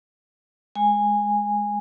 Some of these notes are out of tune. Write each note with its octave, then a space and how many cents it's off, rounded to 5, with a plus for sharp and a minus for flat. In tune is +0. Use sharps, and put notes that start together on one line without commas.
G#3 +0 G#5 -10